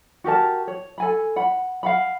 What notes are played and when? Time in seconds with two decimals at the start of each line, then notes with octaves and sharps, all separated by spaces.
0.24 F#4 G4 A#4 A5
0.68 C#5
0.98 A4 G#5 B5
1.36 F#5 B5
1.83 F5 F#5 B5